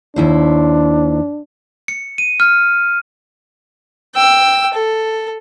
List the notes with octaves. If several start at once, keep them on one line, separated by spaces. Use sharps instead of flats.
D#2 D4 E4 C5
C#7
D#7
F6
G5 E6
A4